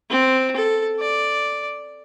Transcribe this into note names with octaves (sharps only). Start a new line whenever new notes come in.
C4
A4
D5